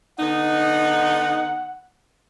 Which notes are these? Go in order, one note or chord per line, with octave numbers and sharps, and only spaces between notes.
D3 B3 D#4 F#5